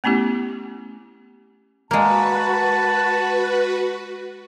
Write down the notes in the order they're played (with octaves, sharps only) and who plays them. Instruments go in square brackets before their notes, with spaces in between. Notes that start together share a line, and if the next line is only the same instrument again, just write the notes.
[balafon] A3 B3 C#4 E4 G4
[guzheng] G#3 A#3 [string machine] F#4 B4 [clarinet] A5